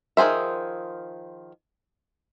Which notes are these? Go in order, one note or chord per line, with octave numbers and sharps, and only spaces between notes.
D#3 F3 G#4 C5 E5